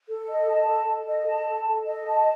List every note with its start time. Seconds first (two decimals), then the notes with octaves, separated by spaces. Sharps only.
0.08 A4
0.28 D#5
0.47 A5
0.67 A4
0.87 A4
1.06 D#5
1.26 A5
1.46 A4
1.66 A4
1.86 D#5
2.06 A5